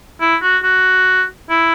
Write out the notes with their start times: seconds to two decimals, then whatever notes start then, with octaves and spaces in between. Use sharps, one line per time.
0.21 E4
0.42 F#4
0.63 F#4
1.50 E4